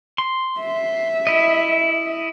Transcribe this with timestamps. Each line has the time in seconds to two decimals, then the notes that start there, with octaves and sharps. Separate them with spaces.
0.18 C6
0.60 E5
1.27 E4 D#5